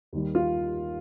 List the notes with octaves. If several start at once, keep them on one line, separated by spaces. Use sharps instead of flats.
D#2 D#3 G3
F4